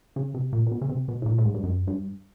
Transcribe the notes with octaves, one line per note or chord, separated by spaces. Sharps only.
C#3
C3
A#2
A#2
B2
C#3
C3
B2
A2
A#2
A2
G#2
G2
F#2
G2